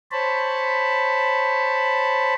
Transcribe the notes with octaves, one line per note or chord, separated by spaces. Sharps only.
C5 C#5 A5 B5